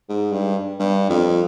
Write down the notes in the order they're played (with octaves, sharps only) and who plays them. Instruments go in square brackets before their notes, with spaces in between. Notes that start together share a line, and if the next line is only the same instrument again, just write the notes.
[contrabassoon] G#2
G2
G2
F2